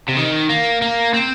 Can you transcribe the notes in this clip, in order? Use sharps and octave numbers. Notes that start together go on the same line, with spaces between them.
C3
D#3
A#3
A#3
C4